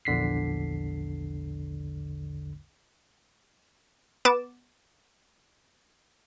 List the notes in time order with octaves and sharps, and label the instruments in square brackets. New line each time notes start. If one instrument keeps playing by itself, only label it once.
[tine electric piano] A#1 E2 D3 B6 C7
[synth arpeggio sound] B3 D6 A6 E7